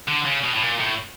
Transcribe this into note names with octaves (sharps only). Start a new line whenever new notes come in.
D3
C#3
B2
A2
A#2
A2